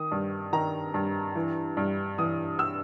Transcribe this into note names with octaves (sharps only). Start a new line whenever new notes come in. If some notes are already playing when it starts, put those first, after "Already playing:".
Already playing: D#3 D#6
G2
D#3 A#5
G2
E3
G2
E3 D#6
E6